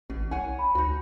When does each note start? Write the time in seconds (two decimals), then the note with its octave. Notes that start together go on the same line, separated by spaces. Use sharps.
0.10 A1 B2
0.31 C2 C#5 F#5 G#5
0.59 B5
0.75 D2 D#4 F#4